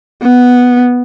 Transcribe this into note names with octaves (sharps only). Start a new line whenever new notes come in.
B3